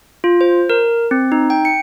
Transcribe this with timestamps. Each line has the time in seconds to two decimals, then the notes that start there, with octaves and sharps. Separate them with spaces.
0.24 F4
0.41 C5
0.70 A#4
1.11 C4
1.32 D#4
1.50 G5
1.65 C#7